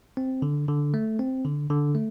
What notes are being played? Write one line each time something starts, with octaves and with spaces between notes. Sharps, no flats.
C4
D3
D3
A3
C4
D3
D3
A3